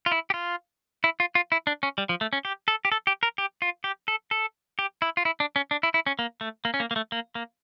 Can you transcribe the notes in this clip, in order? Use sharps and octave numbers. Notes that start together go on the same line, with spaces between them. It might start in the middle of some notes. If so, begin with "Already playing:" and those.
F4
E4
G4
F4
E4
F4
F4
E4
D4
C#4
G3
F3
A3
C#4
G4
A4
G4
A4
G4
A#4
G4
F4
G4
A4
A4
G4
E4
F4
E4
D4
C#4
D4
E4
E4
C#4
A#3
A3
A#3
C#4
A#3
A#3
A3
A#3
A#3